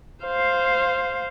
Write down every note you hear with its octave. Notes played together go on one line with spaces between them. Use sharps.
C5 F5